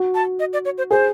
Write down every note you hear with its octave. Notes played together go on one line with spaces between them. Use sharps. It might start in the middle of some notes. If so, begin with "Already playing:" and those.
Already playing: F#4
A5
D#5
D5
C#5
C5
G#4 C5